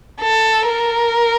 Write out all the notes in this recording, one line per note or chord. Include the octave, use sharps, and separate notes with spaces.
A4
A#4